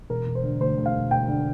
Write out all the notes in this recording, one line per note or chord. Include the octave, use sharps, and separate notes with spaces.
E1 A#4
E1
C5
D3
D2 C5
D2
F5
E1
E1 G5
D3